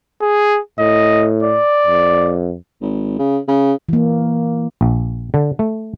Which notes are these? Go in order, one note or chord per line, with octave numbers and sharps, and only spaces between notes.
G#4
A2 D#5
D5
F2
G#1
C#3
C#3
E3 A#3
A#1
D3
A3